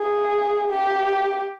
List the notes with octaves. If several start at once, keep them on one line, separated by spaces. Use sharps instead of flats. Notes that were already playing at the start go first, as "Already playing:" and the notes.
Already playing: G#4
G4